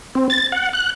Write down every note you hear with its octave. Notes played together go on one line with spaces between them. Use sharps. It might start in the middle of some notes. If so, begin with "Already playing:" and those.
C4
A6
F#5
F#6